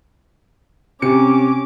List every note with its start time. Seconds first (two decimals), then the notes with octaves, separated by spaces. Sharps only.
1.02 C3 C#4 D6 C#7